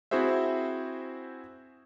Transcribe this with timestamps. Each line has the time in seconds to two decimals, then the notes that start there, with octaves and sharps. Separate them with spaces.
0.11 C4 E4 F#4 G#4 C5 E5